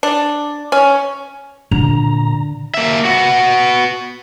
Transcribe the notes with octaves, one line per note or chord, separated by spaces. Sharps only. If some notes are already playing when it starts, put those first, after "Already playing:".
D4
C#4
A#2 D3 A#5
A#3 E5
B3 F#4